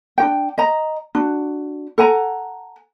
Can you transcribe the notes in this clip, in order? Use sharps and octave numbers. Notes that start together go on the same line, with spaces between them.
D4 F#4 G5
D#5 A#5
D4 F#4
A4 F#5 G#5 A#5